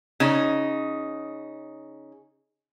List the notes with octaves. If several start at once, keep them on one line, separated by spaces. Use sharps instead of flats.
C#3 D#4